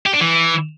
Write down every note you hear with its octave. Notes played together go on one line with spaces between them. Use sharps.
G4
D4
E3